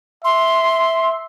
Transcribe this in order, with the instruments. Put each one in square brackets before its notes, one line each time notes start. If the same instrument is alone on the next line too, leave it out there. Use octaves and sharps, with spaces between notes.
[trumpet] E5 [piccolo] C6